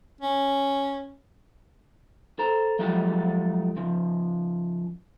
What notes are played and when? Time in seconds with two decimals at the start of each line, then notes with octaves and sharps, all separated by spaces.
0.21 C#4
2.39 A4 C5 A#5
2.79 F3 F#3 G#3 A3 F4 G4
3.76 C#3 F3